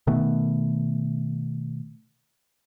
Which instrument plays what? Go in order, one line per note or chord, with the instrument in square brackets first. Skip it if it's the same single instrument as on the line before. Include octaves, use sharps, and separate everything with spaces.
[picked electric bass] B2 D#3 A3 B3